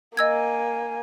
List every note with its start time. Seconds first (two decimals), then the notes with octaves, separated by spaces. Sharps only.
0.17 A#3 D#5 G#5 E6 G#6